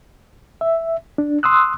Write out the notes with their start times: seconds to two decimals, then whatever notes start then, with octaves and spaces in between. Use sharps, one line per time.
0.61 E5
1.18 D4
1.43 C6 D#6 E6 F#6